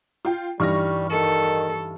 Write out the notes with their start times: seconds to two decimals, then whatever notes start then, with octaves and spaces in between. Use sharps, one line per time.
0.25 F4 G5
0.60 G2 E3 G3 D#4 C#6 F6 A#6
1.11 D#3 A4